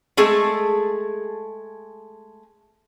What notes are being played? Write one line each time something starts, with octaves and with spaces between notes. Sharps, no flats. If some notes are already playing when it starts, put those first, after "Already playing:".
G#3 A3 G#4 A4